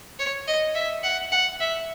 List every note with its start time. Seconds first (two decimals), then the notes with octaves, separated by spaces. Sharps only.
0.19 C#5
0.47 D#5
0.75 E5
1.03 F#5
1.32 F#5
1.60 E5